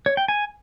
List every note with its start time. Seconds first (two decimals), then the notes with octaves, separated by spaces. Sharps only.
0.06 C#5
0.17 G5
0.28 G#5